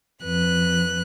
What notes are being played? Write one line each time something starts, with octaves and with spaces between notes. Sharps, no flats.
F2 B4 F#6